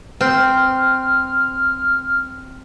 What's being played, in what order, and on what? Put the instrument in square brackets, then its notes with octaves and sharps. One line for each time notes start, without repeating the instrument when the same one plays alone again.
[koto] C4 [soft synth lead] F6